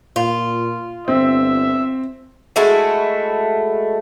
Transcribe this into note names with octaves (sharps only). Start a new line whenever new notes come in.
A#2 F4
G1 C4 E5
G#3 A3 E4 F#4